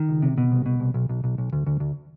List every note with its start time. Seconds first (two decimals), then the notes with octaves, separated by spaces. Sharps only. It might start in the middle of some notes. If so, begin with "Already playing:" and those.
Already playing: D#3
0.09 C#2
0.22 C3
0.38 B2
0.52 C2
0.66 B2
0.80 C2
0.94 B1
1.09 B1
1.24 B1
1.38 B1
1.53 D2
1.67 D2
1.80 D2